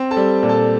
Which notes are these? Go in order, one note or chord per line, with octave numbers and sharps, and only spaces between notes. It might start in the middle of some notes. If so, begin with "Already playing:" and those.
Already playing: C4
A4 A5
G3
A#2
A4 A5